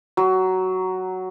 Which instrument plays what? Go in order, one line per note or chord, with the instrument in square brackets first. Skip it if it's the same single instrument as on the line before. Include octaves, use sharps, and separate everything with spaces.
[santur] F#3